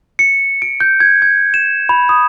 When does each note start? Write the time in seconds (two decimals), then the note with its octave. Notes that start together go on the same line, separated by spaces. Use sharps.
0.19 C#7
0.62 D7
0.80 G6
1.00 G#6
1.22 G#6
1.54 E7
1.89 B5
2.09 D#6